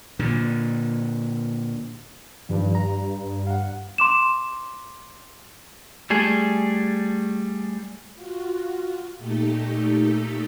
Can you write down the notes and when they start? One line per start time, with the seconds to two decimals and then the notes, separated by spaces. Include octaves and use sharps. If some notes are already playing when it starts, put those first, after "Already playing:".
0.19 A#2 D3
2.49 G2 D#3 F3
2.75 A#5
3.47 F5 F#5
3.98 C6 D6 E7
6.10 G3 A3 G#4
8.15 F4 F#4
9.18 A#2 A3 D#4 G4 A4